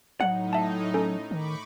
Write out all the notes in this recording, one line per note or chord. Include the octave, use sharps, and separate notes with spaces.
A2 F#3 D#4 F#5
E5 A5
C#4 A4
D#3 B5 C#6 D6